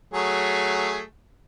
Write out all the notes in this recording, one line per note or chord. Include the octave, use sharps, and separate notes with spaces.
F#3 A3 G#4